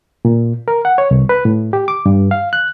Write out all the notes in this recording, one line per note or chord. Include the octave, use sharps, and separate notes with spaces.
A#2
A#4
F#5
C#5
C2
B4
A2
G4
D6
G2
F5
F#6